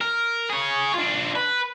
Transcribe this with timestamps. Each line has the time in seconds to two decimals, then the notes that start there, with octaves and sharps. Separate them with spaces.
0.01 A#4
0.50 G#4 C#5
0.94 D4 F4
1.36 B4